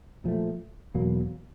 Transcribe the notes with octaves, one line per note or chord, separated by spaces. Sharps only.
A#2 F3 A3
E2 B2 F#3 A#3